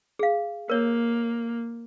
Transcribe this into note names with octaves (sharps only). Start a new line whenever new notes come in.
G#4 F5
A#3 A#4 C#5